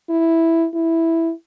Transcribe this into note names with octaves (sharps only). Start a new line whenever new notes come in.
E4
E4